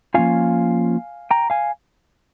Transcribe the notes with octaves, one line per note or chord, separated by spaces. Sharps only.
F3 A#3 C#4 F4 F5 G#5
G5 A#5
F5 G#5